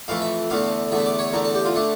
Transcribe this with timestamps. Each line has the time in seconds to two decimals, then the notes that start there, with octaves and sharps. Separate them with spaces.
0.08 F2 E3 A3 F5
0.21 E5
0.50 E2 D3 A3 F5
0.91 E2 D3 A3 E5
1.06 D5
1.19 C#5
1.33 E2 D3 A3 A#4
1.44 A4
1.55 G4
1.65 F4
1.75 D3 A3 D4